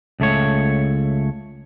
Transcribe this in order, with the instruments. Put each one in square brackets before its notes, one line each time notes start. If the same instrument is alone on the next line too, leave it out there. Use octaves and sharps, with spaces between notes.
[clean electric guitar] C#2 A3 C#5